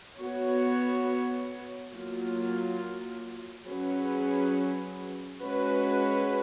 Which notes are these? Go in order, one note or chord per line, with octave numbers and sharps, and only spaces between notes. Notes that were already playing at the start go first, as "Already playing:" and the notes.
B3 F#4 C#5
F#3 A#3 F4
F#3 C#4 G#4 B4
G#3 C#4 F#4 B4